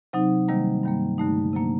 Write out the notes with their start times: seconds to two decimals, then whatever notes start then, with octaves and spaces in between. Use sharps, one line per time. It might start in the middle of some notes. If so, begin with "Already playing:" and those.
0.13 C3 F#3 C4 D#4
0.48 C3 D#3 G3 A#3
0.83 G2 D#3 G3 A#3
1.18 G2 D3 A3 D#4
1.53 C3 F#3 A#3 D4